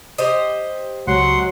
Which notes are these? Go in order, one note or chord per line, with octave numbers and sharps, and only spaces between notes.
G4 C5 D#5
C#2 F#3 F#5 C6